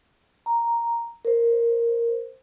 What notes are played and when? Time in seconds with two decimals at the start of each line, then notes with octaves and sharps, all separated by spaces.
0.46 A#5
1.25 A#4 C5